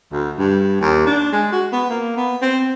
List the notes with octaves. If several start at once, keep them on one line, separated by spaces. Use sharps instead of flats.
D2
G2
D#2
D4
G#3
F#4
B3
A#3
B3
C4